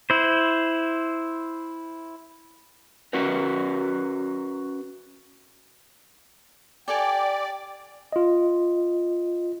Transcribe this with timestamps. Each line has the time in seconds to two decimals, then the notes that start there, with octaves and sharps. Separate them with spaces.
0.10 E4 C5
3.13 C#4 F#4 A#4 B4
6.88 G4 A4 D5 G5 G#5
8.13 F4 D#5